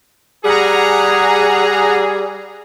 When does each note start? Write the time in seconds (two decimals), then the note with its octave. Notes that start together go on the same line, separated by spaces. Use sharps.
0.45 G3 G#4 F#5 A#5